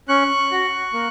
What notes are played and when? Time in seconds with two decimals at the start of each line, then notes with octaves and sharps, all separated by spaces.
0.08 C#4 C#6 F#6
0.52 F#4
0.93 A#3